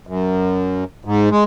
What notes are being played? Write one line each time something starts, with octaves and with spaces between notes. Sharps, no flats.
F#2
G#2
G#3